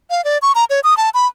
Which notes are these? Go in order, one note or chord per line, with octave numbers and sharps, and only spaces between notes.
F5
D5
C#6
A#5
C#5
D#6
A5
B5